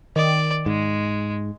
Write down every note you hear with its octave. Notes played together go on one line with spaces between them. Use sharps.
D#3 D5
G#2 G#3